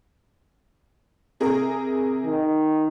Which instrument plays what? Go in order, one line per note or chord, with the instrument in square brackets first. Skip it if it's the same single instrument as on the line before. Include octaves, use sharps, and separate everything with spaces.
[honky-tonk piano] C3 G#4 A#4
[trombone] D#3